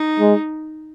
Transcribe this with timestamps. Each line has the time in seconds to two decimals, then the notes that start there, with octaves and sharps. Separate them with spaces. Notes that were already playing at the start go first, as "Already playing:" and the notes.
Already playing: D#4
0.20 G#3